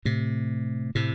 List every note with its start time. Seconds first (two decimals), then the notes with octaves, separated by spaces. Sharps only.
0.05 A2 C3
0.95 A2 C3